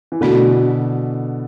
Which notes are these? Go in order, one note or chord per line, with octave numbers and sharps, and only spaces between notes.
E3
B2 D3 A3 D4 F#4